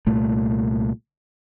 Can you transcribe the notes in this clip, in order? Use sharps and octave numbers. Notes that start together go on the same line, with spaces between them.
C2 A#2 A3